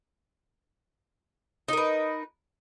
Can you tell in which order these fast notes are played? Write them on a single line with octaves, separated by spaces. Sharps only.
D#4 A#4 B4